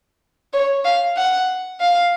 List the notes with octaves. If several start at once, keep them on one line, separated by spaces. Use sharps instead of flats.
C#5
F5
F#5
F5